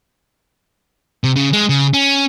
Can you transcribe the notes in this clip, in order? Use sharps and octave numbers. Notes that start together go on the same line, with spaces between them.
C3
C#3
G#3
C#3
C#4